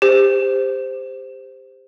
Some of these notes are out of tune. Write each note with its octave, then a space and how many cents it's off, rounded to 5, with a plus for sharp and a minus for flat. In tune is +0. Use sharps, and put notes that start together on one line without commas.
G4 +25 C5 -5